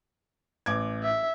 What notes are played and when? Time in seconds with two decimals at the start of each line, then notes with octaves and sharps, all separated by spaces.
0.66 A1 D6 G#6
1.04 E5